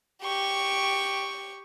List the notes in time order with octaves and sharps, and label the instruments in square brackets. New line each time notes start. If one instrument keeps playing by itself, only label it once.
[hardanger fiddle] G4 C#6